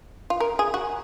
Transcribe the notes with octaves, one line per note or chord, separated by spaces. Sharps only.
F4
A#4
G#4
F#4